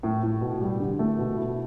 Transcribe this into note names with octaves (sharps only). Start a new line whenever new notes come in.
A2
A2
B2
G3
D3
A3
B2
E4